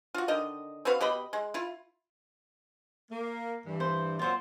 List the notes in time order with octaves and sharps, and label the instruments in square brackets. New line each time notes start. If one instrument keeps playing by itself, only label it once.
[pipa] F4 F#4
D3 D#3 D#5
C4 F#4 B4 F5
B2 G4 D#5 B5
G#3
E4 F4
[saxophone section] A#3
G2 E3
[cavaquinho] C5
[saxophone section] A#2 F#3 C4 [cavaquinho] F4 C5 F#5